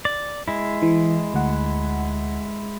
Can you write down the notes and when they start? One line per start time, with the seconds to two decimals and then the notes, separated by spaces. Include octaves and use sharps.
0.05 D5
0.48 G#3 E4
0.82 E3
1.34 D2 F#5